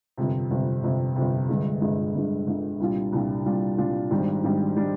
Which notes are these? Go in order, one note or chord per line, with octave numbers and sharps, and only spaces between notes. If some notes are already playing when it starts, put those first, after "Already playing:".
G1 F2 C3
G1 F2 C3
G1 F2 C3
G1 F2 C3
G1 G2 D3 G#3
G1 G2 D3 G#3
G1 G2 D3 G#3
G1 G2 D3 G#3
C2 A#2 G3 D4 F4
C2 A#2 G3 D4 F4
C2 A#2 G3 D4 F4
C2 A#2 G3 D4 F4
G#1 G#2 G3 D4
G#1 G#2 G3 D4
G3 D4